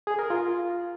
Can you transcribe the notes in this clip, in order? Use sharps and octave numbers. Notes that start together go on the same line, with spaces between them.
G#4
A#4
F4